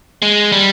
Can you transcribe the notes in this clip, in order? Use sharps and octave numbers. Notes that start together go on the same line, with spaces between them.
G#3
G3